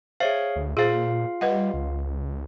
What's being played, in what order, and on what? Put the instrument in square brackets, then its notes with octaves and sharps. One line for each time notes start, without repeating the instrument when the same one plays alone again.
[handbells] G#4 C#5 F5 [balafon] C5 E5
[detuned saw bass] D2
[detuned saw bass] A#2 [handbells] F4 F5 [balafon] G#4 C5
[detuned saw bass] G3 [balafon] B4 D#5 F#5
[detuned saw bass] C#2